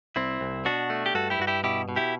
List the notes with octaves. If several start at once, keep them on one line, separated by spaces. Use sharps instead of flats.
C2 C4 E4
C2
B2 D4 F#4
A3
G4
G2 F#4 A4
E4 G4
G2 F#4
E4 G4
B2 E4 G4
B2
E4 G4